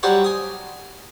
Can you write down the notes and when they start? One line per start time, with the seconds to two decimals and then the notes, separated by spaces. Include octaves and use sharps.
0.03 F#3 G3 G4 C5 C#5 F#5
0.24 G#5 D#6